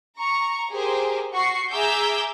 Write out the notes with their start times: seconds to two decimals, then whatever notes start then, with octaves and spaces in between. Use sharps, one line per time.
0.19 A#5 C#6
0.72 G4 G#4 A#4 C5
1.34 F#4 C#6 C7
1.71 G#4 E5 A#5 D6 E6 G6